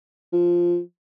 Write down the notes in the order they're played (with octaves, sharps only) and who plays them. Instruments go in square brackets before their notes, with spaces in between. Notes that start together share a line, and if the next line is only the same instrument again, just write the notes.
[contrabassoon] F3